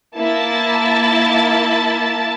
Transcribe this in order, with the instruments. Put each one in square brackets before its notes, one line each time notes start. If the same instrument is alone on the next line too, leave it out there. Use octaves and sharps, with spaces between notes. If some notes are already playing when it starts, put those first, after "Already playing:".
[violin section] A#3 E4 A5 A6